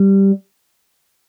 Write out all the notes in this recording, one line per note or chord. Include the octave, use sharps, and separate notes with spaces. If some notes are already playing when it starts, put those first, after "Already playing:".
Already playing: G3